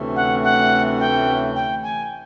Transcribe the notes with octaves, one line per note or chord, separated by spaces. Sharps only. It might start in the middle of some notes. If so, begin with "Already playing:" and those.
Already playing: D2 C3 E3 A3 C#4
F#5
F#5
G5
G5
G#5